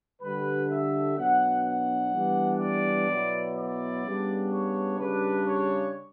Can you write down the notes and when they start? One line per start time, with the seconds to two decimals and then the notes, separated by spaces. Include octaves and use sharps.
0.21 D3 G3 D4 B4
0.70 E5
1.17 B2 F#3 B3 D4 F#5
1.65 F#5
2.13 E3 G3 B3 D4
2.60 D5
3.08 B2 F#3 B3 E4
3.55 D5
4.04 C#3 G3 B3 D4
4.52 C#5
4.99 C#3 G3 D4 B4
5.46 C#5